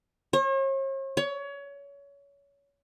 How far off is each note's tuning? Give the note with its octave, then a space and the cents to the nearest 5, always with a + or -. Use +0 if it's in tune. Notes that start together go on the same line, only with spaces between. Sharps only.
C#5 -45
C#5 +25